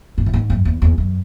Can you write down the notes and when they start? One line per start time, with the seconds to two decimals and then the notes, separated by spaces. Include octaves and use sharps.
0.18 G#2
0.26 A2
0.33 G#2
0.50 F#2
0.65 E2
0.82 E2
0.98 F#2